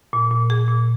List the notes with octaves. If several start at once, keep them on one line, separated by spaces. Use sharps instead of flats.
A#2
A#2
G#4
A#2